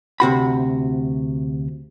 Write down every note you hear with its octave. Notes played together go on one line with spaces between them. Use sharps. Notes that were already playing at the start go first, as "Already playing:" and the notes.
D2 C3 F#4 B5